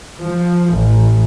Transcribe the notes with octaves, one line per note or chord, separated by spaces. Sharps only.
F3
A1